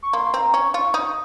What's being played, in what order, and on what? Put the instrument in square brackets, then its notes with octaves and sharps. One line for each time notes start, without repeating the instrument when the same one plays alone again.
[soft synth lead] C#6
[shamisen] A#3 [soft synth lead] C6
[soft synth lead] C6
[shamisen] C4 [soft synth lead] A#5
[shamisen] C#4 [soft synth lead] C#6
[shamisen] F4 [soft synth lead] C#6
[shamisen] D#4 [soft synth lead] D#6